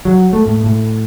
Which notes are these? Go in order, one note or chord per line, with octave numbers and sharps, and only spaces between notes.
F#3
A3
A2
A2